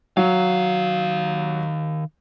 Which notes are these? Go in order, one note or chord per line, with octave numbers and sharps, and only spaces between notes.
D#3 F#3 F5